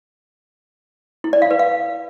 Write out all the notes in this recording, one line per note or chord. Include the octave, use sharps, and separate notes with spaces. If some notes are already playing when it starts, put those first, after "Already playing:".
E4
D5
F5
B4
F5